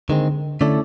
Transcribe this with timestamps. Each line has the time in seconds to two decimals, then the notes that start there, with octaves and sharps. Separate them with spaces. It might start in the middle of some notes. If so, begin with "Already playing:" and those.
0.09 D3 D#3 G#3 C4
0.61 D3 A3 C#4 E4 A4 D5